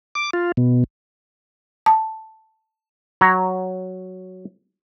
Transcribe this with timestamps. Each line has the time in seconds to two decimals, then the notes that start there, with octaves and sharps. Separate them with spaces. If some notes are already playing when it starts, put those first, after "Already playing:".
0.15 D6
0.33 F4
0.57 B2
1.86 A5
3.21 F#3 C#5 A#5